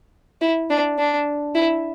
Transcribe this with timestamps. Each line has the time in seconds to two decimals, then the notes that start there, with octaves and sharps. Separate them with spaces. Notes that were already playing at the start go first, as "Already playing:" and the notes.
0.41 E4
0.70 D4
0.99 D4
1.55 E4